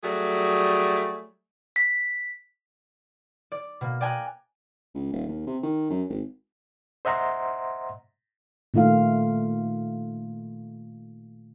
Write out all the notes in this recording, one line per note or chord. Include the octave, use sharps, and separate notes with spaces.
F#3 G3 A3 G#4
B6
D5
B2 A#3
D5 G5 G#5 A#5 D#6 F#6
C#2
D#1
D#2
C3
D#3
F#2
G#1
C5 D#5 E5 F#5 A#5 C6
A#2 D#3 A3 F4 F5